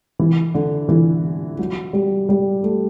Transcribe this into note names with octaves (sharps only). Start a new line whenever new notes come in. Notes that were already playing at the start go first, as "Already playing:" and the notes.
E3
D3
E3
F#3
G3
G3
A3